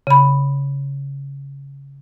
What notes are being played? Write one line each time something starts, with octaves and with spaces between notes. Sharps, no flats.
C#3 B5